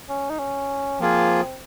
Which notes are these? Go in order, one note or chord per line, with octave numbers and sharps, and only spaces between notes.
C#4
D#4
C#4
F3 A#3 C4 F4 G#4